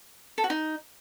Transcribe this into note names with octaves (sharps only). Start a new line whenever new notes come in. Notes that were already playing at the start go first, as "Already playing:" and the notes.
A4
F#4
D#4